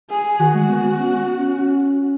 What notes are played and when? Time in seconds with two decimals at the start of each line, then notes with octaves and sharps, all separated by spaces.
0.10 G#4
0.39 D#3 F#4
0.54 G#3
0.68 B3
0.83 B3
0.99 C#4
1.18 B3
1.38 C#4
1.57 C#4